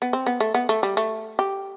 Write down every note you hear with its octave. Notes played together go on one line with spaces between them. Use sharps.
B3
C4
B3
A3
B3
A3
G3
A3
G4